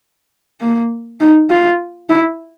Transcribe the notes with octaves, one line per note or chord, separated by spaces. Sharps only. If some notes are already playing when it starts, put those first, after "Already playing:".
A#3
D#4
F4
E4